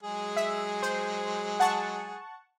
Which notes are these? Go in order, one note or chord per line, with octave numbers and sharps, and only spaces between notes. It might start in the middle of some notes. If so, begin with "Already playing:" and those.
F#3 G#3 G#4
E5
C5
F#5 A5 C#6